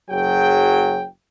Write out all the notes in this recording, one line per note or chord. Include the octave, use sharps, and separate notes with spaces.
F#1 F#3 G#4 G5